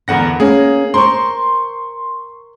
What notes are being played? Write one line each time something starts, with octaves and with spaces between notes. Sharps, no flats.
E2 D3 B3 A#4 F#5 A#6
A#3 C#4 G#4
A#4 C5 C6 C#6